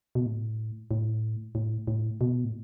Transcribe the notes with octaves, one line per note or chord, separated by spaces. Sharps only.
B2
A2
A2
A2
A2
B2
A2